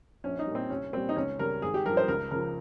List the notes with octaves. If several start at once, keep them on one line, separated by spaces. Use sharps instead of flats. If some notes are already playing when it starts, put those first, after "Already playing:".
A#1 C#4
D#4
A#2 G3
C4
C2 C#4
A#2 G3 C4
D#4
C#2 C#4
C#3 G3 A#4
G#1 G#4
G4
G2 F3 A#4
C5
C#2 A#4
C#3 F3 A#4